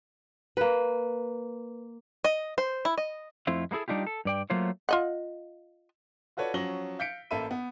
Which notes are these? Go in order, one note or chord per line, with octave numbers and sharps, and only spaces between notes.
A#3 B4
D#5
C5
E4
D#5
F2 A3 C4 E4 F4
G#3 A#3 E4 G#4 A4
G3 D4 D#4 F4 G4
A4
G2 D5 G5
F#3 A3 A#3 F4 C5 C#5
F4 D#5 F#5
F4 F#4 A4 B4 C#5 D5
F3 F#3 C#4 A#6 F#7 G7
F5 G6 B6 C#7 D7
A1 A#3 A4 E5 B5 D#7
B3